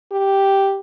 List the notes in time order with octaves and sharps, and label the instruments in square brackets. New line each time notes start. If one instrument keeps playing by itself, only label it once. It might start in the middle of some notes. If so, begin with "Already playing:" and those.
[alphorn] G4